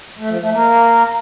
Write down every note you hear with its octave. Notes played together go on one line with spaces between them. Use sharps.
A3
F3
A3
A#3